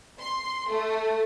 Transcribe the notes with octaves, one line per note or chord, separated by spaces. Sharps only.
C6
A3